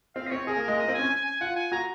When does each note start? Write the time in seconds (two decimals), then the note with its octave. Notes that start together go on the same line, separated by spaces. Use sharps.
0.15 C4 F5
0.26 D#5
0.31 C4 C#5
0.47 G#4 A#4
0.57 A#3
0.63 A#4
0.68 G#3
0.78 A#3 D#5
0.88 C4
0.94 G#5
0.99 C#4
1.10 G#5
1.25 G#5
1.41 F4 F#5
1.56 G#5
1.72 F#4 A#5